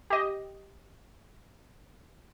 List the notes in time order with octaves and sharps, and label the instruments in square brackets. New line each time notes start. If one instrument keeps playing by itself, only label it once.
[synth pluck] G4 D#5